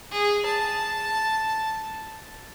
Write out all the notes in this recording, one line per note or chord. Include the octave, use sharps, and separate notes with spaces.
G#4
A5